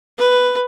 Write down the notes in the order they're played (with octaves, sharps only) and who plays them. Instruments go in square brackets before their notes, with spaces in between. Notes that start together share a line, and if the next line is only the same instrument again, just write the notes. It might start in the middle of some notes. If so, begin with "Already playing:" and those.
[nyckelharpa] B4